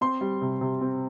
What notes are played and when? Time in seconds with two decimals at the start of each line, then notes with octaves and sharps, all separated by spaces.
0.01 C4 C6
0.21 G3
0.41 C3
0.61 C3
0.81 C4